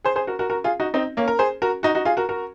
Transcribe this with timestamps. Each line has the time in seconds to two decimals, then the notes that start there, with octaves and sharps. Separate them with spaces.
0.04 G#4 C5
0.16 G#4 C5
0.27 F#4 A#4
0.39 F#4 A#4
0.50 F#4 A#4
0.64 F4 G#4
0.80 D#4 F#4
0.94 C4 D#4
1.17 A#3 C#4
1.28 A#4
1.39 G#4 C5
1.62 F#4 A#4
1.83 D#4 F#4
1.95 D#4 F#4
2.05 F4 G#4
2.17 F#4 A#4
2.29 F#4 A#4